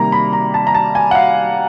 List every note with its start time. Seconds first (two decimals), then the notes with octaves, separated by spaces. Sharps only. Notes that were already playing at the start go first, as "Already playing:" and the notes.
Already playing: C3 D#3 G3 A#3 A#5
0.12 B5
0.33 A#5
0.54 A5
0.67 A#5
0.74 A5
0.95 G#5
1.11 F#5
1.15 F5